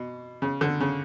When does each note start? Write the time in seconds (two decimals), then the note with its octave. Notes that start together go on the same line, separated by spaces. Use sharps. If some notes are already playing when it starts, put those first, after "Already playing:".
Already playing: B2
0.42 C#3
0.61 D3
0.80 C#3